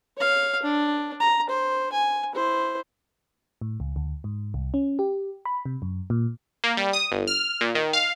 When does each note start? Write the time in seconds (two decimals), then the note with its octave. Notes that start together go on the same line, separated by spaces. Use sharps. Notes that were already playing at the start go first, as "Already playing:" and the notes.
0.17 C#5 F5
0.62 D4
1.20 A#5
1.50 C5
1.92 G#5
2.34 E4 C5
3.61 A2
3.80 C#2
3.96 D2
4.24 G#2
4.54 C2
4.74 C#4
4.99 G4
5.45 B5
5.65 C3
5.82 F#2
6.10 A#2
6.64 A#3
6.77 G3
6.93 D#6
7.11 G1
7.27 F6
7.61 A#2
7.75 D#3
7.93 F5